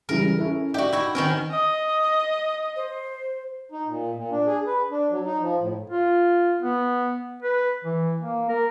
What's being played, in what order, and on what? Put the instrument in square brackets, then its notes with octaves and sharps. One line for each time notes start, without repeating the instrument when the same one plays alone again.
[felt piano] C#3 E3 G3 [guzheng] A#4
[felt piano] C#4 E4 A4
[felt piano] D#4 D5 E5 [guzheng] F#4 G4
[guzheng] E4 F#4
[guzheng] D#3 C#4 A#4 [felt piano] C4 C5
[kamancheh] D#5 [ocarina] D#6
[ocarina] C5
[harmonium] D#4
A#2
A#2
D4
G#4
B4
D4
F#3
D#4
F3
A2
[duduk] F4
B3
B4
E3
A#3
A#4